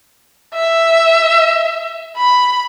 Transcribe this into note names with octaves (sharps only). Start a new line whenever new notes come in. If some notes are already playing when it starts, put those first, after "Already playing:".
E5
B5